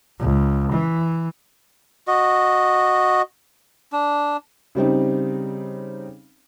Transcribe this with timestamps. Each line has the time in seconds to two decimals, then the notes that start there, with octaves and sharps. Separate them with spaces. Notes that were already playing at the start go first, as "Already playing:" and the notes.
0.20 C#2
0.72 E3
2.08 F#4 D#5
3.93 D4
4.75 C#3 G3 C4 D#4